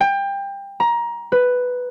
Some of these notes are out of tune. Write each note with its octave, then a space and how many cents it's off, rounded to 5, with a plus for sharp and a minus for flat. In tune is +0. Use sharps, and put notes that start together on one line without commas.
G5 +25
A#5 +20
B4 +5